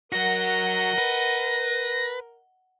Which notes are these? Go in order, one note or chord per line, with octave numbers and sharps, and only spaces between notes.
F#3 F#4 A#4 D#5 F#5 A#6
B4